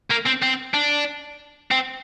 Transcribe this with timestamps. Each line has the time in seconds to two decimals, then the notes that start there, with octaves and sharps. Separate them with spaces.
0.11 A#3
0.26 C4
0.43 C4
0.74 D4
1.71 C4